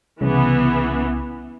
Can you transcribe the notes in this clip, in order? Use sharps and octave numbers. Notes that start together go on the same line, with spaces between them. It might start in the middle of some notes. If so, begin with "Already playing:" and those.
C2 C#3 E3 B3